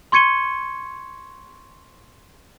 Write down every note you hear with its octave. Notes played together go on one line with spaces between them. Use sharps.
C6 C#6 G#6 C#7 D#7 G7